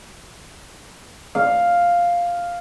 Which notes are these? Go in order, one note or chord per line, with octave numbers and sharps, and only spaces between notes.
F5